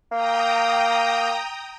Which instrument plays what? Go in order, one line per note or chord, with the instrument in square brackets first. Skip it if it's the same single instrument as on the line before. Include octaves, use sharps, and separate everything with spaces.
[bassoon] A#3 [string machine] G5 A#5 D#6